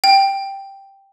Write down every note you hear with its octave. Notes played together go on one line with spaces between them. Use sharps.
G5